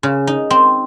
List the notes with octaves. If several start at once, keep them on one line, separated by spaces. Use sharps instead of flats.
C#3
D#4
C4